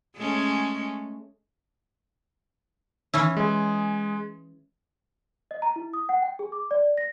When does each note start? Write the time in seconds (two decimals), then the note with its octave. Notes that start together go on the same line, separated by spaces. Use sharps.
0.17 G#3 A3 C#4
3.14 E3 C#4 E4
3.37 G#3 G#4
5.51 D#5
5.62 A#5
5.76 E4
5.93 D#6
6.09 F#5
6.22 G5
6.39 G#4
6.52 D6
6.71 D5
6.98 A#6